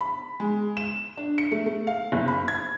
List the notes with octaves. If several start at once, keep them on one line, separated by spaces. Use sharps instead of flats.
B5
G#3
E7
D4
C#7
A3
A3
F5
F#1
B5
G#6